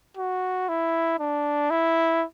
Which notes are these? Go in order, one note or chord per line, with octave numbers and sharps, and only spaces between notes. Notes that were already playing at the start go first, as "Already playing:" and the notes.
F#4
E4
D4
E4